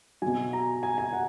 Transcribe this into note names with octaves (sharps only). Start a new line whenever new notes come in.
B2 F#3 G#5
A#5
G#5
G#5
F#5